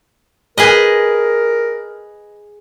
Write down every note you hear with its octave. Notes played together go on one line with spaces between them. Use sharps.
G#4 A#4 B4 D#5